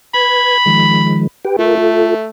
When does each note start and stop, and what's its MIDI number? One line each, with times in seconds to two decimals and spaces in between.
0.14 0.58 71
0.14 1.24 83
0.14 0.58 92
0.66 1.27 51
0.66 1.27 53
0.66 1.27 56
1.45 1.56 67
1.45 1.56 71
1.45 1.56 79
1.59 2.28 57
1.59 1.75 65
1.59 1.75 70
1.77 2.14 65
1.77 2.14 69